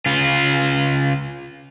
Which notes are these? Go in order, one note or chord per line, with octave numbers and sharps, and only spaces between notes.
C#3 F4